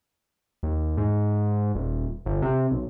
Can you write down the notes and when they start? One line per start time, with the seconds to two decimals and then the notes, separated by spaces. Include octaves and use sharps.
0.63 D#2
0.97 G#2
1.75 D#1
2.26 G1
2.42 C3
2.71 B1